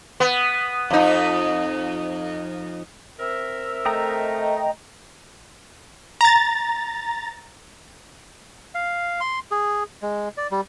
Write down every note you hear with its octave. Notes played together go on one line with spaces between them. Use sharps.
B3
F2 D#4
C4 A#4 E5
A3 D#5 G5 A#5
A#5 A6
F5
C6
G#4
G#3
D5
G3